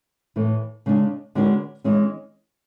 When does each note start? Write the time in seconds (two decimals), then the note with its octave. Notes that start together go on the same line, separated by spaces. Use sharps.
0.36 A2 E3 A3
0.86 C#3 G#3 D4
1.35 D3 G#3 C#4 F#4 B4
1.84 E3 G#3 C#4